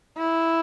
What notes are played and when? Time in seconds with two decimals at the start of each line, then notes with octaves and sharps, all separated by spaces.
0.17 E4